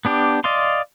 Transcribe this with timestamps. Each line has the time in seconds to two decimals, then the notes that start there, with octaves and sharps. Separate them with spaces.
0.05 B3 D4 G4
0.44 D5 D#5 F5 C6